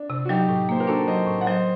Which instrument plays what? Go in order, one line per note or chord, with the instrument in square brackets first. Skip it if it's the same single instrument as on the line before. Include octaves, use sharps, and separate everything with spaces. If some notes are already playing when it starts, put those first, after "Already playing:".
Already playing: [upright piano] D4
[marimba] C3
[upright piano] F#4
[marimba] F#3 [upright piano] D#4 G4
[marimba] A2
[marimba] A#3 [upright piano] C5
[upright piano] A#4
[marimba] D4 [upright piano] F#4 A4
[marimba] F#3 [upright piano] C5 D#5
[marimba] A2
[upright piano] F#5
[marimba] F#3 [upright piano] C5 D#5